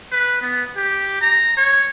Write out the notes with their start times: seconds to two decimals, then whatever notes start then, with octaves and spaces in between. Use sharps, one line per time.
0.12 B4
0.42 B3
0.77 G4
1.22 A#5
1.57 C#5